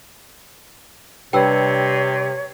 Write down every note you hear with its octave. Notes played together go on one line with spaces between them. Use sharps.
C3 G3 D4 B4 C#5 G5 E6